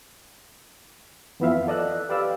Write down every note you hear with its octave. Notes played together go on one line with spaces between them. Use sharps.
F2 E3 B3 F4 E5 F5
A4 D5 D#5 E6 F#6
G4 B4 D5 F5 E6